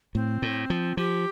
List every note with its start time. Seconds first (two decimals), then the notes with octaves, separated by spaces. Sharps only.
0.15 A2 C4
0.42 A2
0.70 F3
0.97 F3 G4